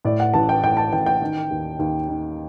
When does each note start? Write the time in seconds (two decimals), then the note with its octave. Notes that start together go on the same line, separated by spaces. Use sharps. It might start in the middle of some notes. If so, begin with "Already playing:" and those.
0.05 A2 D5
0.20 F#5
0.34 A1 A5
0.49 G5
0.64 A2 G5
0.77 A5
0.93 A1 G5
1.06 G5
1.21 D#3
1.50 D#2
1.79 D#2
2.08 D#3